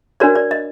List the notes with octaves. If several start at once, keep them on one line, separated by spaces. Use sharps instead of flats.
D4 F#4 A#4 C#5 D5
D5
D#5